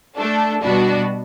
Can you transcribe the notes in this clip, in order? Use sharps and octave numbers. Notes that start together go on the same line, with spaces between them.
A3 D4 A4
B2 G3 B3 D4 F#4